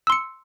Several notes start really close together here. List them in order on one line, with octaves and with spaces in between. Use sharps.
E6 C6 C#7